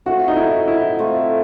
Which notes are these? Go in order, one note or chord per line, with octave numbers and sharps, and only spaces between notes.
A3 C4 F4 F#4
D#4
E4
E4
A3 C4 F4